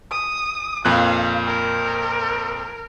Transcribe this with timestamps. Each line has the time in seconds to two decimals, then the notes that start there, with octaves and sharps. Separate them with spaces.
0.11 D#6
0.85 F2 A#2 F5 F#6
1.47 A#4